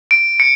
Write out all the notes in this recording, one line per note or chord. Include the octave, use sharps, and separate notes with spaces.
D7
C#7